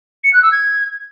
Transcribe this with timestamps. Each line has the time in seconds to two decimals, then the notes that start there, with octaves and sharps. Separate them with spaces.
0.24 C#7
0.33 F#6
0.42 E6
0.52 G#6